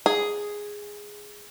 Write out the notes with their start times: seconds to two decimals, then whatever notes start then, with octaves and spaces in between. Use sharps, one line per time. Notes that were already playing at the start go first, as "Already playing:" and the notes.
0.06 G#4